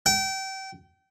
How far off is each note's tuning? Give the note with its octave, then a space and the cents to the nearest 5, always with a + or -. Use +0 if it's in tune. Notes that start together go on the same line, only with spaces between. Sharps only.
G5 -30